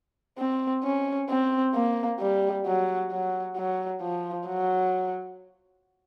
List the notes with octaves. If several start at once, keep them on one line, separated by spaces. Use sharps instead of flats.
C4
C#4
C4
A#3
G3
F#3
F#3
F#3
F3
F#3